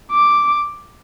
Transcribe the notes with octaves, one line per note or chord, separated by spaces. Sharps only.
D6